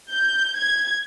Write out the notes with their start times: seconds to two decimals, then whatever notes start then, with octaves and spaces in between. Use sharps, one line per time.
0.11 G6
0.57 G#6